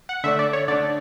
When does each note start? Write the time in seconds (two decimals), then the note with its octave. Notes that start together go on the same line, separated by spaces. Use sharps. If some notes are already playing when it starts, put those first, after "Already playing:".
0.09 F#5
0.24 D3 A3 D4 E5
0.39 D5
0.53 C#5
0.68 D3 A3 D4 D5